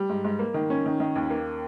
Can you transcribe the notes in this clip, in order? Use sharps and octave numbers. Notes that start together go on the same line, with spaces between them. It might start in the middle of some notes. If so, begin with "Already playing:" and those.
Already playing: G3
G#2
G#2
A#3
D#3
C#4
D#3
D#3
D#2
A#3